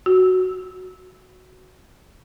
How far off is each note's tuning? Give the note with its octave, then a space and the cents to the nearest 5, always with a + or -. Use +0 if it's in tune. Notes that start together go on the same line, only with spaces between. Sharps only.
F#4 +0